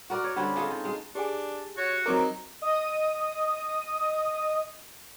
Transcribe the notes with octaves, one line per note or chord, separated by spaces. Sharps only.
F#4 A#4 D5
C#5
D3 G3 C4 C#4
G#3 F4 A4 D#5
D#3
G#3
D4 G4 G#4 G#5
F#4 C#5
F#3 C4 D#4 A#4 A#5 C#6 D6
D#5 D#6